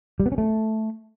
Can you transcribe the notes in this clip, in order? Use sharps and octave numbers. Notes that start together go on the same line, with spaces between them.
G3
B3
C#4
A3